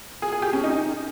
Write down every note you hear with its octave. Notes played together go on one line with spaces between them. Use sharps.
G#4
G#4
G4
C#4
D#4